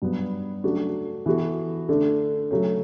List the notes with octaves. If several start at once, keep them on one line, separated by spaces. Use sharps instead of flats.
G2 F#3 B3
C#3 F#3 A3 D4 F#4
E3 B3 F#4 A4
D3 A3 D4
C#3 F#3 A3 C#4